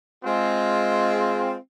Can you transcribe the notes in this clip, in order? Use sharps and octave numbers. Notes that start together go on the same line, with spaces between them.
G#3 C4 F4